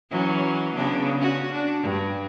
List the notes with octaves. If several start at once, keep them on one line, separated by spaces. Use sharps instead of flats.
E3 F#3 C#4
C#3 B3 D4
C#4 F#4
D4
G2